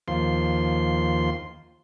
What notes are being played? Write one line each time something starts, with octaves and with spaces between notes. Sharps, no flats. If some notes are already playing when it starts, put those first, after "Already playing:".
D#2 F3 C6